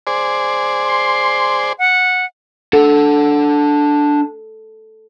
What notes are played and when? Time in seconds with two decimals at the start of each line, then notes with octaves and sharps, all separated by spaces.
0.07 G#4 C5 D5
0.84 C6
1.79 F#5
2.73 D4 A4 F#5